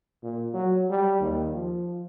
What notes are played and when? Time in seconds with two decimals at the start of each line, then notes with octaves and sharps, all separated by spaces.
0.23 A#2
0.54 F#3
0.90 G3
1.21 D#2
1.54 F3